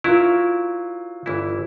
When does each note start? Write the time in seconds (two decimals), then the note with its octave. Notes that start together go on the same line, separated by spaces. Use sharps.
0.04 F#3 E4 F4 A#4
1.26 G1 E3 E4